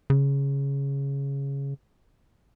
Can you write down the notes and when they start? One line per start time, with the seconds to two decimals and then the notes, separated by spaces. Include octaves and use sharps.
0.10 C#3